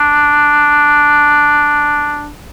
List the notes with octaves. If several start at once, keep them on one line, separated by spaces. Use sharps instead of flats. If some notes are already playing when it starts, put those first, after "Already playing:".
Already playing: D4